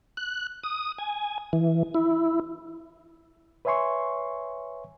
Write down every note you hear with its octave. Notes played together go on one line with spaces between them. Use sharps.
F#6
D#6
G#5
E3
E4
B4 C#5 E5 G#5 C6 C#6